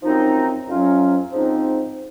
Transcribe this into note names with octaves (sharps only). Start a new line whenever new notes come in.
F#2 F3 C4 D#4
F2 C3 F#3 C#4 F4
G#2 F3 C4 D#4